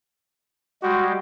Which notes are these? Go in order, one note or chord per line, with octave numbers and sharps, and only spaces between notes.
G3 G#3 F#4 G4